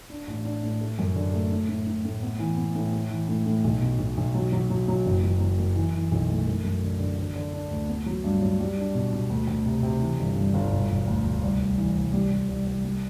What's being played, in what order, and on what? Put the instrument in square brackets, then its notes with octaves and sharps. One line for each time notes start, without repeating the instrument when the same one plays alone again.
[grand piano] D4
A1
D4
A2
A3
F#2
D3
A3
A2
A2
A2
A2
B3
E3
B3
A2
A3
E3
A2
A2
B1
B2
B1
B1
F#3
F#3
F#3
F#3
F#1
F#3
F#3
F#2
E3
E3
B1
A3
F#2
F#2
D3
D3
D3
D3
D4
D2
B3
F#3
G2
F#3
G3
D4
B2
B2
D2
D2
C3
C3
E3
G1
G2
G1
E1
E1
D2
D2
C2
C2
E3
C2
G3
G3
C2
C2
G3